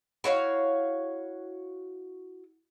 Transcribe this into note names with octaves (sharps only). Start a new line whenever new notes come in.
E4 F#4 C#5 F5